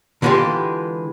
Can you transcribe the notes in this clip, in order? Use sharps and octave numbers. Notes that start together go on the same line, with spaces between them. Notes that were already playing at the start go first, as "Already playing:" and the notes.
D3 E3 G#3 B3 F4 G4